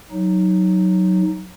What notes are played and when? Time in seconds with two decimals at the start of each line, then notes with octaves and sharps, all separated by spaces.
0.12 F#3 D#4